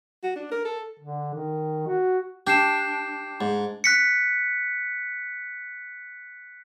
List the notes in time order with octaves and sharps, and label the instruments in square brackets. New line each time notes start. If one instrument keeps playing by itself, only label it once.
[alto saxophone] F#4
D4
A#4
A4
[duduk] D3
D#3
F#4
[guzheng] D4 [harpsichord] G4 [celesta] G6 C7 E7
[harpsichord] G#2
[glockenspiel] F#6 B6 C#7